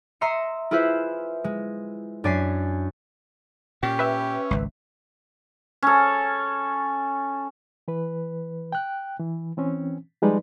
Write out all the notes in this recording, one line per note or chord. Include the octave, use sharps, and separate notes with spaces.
D#5 E5 A#5 C6 C7 C#7
E4 F4 G#4 B4 C5 E5
G#3
F#2 D4 D5 G#5 B6 C7
A#2 C#4 G4
B4 E5
G#1 C#2
C#4 A4
E3 B4
G5 F#6
E3
E3 C4 C#4
F3 G3 G#3 D#4 B4 D5